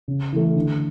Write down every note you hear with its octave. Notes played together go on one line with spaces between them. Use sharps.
C#3
E3 A3
D3